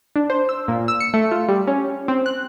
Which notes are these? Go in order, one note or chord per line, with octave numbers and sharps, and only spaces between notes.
D4
C5
E6
A#2
E6
C#7
A3
F4
G3
C#4
C4
F#6